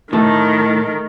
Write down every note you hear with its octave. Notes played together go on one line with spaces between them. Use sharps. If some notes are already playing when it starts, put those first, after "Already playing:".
A2 D#3 A3 A4